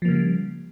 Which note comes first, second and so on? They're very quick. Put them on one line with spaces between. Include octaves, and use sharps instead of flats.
F3 A#3 C#3 G3